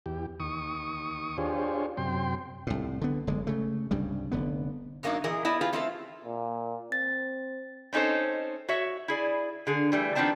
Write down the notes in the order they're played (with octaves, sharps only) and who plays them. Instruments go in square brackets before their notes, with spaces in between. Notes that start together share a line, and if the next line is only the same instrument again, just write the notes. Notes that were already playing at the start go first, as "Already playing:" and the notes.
[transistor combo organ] E2 G4
D#2 C#6 D#6
D4 F4 G4 G#4 C5 C#5
F#2 C3 G5 C6
[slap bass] C2 A2
D3 B3
F#1 D3 G#3
C#3 A3
C2 G2 C#3 G3
F1 D3 B3
[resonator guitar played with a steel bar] F#2 F#3 A#3 C4 D4 D#4
A#2 E3 G#4 A#4 D#5
B3 E4 D5 D#5 A5
F4 G4 G#4 B4
A3 C4 D4 F4 A4 F5
[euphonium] A#2
[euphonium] C4 [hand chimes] A6
[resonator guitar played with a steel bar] C4 C#4 D#4 A4 C5
F#4 C#5 E5
E4 G#4 D5
D3 G#4
E3 G3 A3
D#3 F3 B3 C4 D4 A5